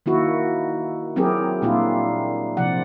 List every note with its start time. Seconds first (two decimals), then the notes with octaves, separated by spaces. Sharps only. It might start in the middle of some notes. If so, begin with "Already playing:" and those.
0.06 D#3 A#3 E4 F#4
1.16 F#3 C4 E4 G4 G#4 A#4
1.62 A#2 G3 A#3 D4 E4 F4
2.57 C3 F3 D5 F#5